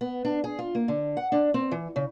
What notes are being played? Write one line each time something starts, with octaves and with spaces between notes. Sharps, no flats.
B3
D4
G#4
F4
A#3
D3
F#5
D4
C4
E3
C#3